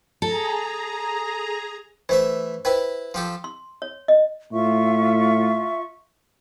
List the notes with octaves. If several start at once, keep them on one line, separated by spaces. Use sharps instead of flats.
G#4 A4 A#5
E3 A3 C5 E5
E4 B4 C5 G5
F3 G4 A4
C6
C#5
D#5
A2 F4 E5 C#6